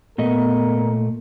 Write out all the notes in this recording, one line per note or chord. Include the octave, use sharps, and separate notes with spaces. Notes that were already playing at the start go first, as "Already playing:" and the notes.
A#2 A3 B3 A#4 D#5